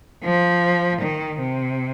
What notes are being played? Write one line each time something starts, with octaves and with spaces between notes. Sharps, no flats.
F3
D#3
C3